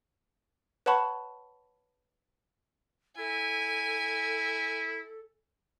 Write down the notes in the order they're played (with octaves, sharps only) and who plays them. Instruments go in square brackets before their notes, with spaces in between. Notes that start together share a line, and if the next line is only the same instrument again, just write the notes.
[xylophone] B4 C#5 F#5 A5 B5 C#6
[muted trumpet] E4 [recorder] A4 [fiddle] G#5